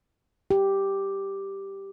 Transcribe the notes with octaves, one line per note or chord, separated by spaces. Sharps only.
G4